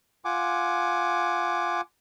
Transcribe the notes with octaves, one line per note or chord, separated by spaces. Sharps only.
F4 F#5 G#5 D6